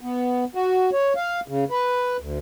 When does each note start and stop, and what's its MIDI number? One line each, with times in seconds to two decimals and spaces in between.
0.01 0.45 59
0.55 0.90 66
0.93 1.13 73
1.16 1.40 77
1.48 1.64 49
1.70 2.17 71
2.20 2.38 38